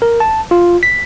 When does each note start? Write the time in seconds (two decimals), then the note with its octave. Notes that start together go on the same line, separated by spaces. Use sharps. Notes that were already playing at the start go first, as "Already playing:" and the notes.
0.02 A#4
0.20 A5
0.51 F4
0.83 B6